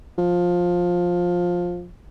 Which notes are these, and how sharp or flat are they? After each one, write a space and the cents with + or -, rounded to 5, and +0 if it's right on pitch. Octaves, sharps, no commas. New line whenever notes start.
F3 +15